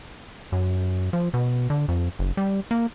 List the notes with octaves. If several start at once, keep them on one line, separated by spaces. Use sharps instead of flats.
F#2
F3
B2
D3
F2
F#1
G3
A#3